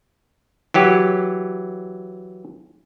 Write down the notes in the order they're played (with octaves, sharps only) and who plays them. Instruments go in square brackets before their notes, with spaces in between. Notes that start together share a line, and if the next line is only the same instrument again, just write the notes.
[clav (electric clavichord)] E3 F#3 G4